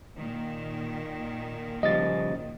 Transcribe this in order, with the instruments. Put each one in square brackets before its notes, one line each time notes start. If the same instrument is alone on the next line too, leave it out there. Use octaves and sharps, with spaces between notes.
[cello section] A#2 D#3
[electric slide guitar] C#3 F3 G3 [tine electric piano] D#5 A6